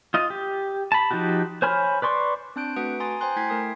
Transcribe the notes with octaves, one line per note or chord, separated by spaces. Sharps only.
F4 D#5
G4
A5 B5
F3 D#4 F#4 G4
C5 C#5 G#5 B5 F6
B4 D5 C6 C#6
C4 D4 A5 F#6 G6 D7
A3 F#4 B4 F#5 D#6 D7
G#5 A#5 C6 D#6 A6
C5 G5 G#5 A#5 C6 F#6
A3 E4 G5 G#6 B6 C7
A3 A#4 D#6 C7